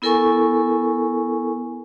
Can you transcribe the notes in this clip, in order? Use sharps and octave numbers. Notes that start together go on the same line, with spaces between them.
B3 E4 A4 A#4 G#5 C#6